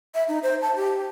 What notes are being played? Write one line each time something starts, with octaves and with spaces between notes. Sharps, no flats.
E5
D#4
C5
A5
G4